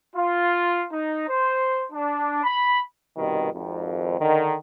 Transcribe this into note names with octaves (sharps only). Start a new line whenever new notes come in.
F4
D#4
C5
D4
B5
C2 G2 B2 D#3
G#1 F2
D3 D#3